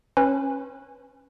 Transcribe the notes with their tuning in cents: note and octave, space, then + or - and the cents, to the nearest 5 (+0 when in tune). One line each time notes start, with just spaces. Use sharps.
C#4 -20 B4 -5